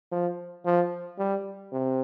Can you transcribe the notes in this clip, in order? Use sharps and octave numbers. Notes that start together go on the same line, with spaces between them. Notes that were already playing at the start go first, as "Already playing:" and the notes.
F3
F3
G3
C3